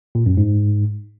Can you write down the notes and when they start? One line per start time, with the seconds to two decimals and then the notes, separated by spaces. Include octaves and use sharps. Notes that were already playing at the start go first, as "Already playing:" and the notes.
0.15 A#2
0.26 F#2
0.37 G#2